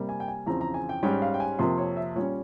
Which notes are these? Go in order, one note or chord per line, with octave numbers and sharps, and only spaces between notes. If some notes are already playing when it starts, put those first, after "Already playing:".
Already playing: C3 G3 A#3
G#5
G5
G#5
E2 C#3 F3 C4 A#5
A#5
G#5
G5
G#2 G3 C#4 G5
F5
G5
G#5
F2 C3 F3 A#3 C6
C#5
E5
A#2 G3 C#4 C#5